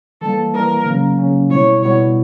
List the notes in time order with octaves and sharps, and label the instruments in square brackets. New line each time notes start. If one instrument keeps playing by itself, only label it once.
[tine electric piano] E3 G3 A#3 [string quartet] A4
[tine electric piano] E3 G3 A#3 [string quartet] A#4
[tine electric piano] C#3 F#3 A#3 C#4
C#3 F#3 A#3 C#4
[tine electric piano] B2 G3 B3 E4 [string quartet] C#5
[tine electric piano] B2 G3 B3 E4 [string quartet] C#5